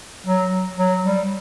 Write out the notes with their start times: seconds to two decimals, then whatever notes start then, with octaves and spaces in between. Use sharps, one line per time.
0.27 F#3
0.77 F#3
1.04 G3